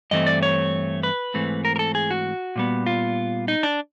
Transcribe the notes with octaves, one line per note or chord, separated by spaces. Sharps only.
G2 E3 A3 C4 D#5
D5
C#5
B4
G#2 E3 A3 C4
A#4
A#4
A4
G#4
F#4
A#2 G3 B3
F4
D#4
D4